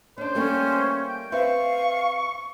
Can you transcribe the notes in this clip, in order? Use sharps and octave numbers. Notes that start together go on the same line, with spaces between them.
C#4 D4 C5
G3 A3 A#3 C#4
G5
C4 B4 E5 F5 C#6